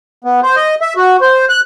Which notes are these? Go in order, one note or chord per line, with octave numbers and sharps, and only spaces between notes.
B3
C5
D#5
E5
F#4
C5
F#6